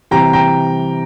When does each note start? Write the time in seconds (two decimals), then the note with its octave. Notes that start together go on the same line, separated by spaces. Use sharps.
0.11 C3 E3 G3 G5 A#5
0.33 G5 A#5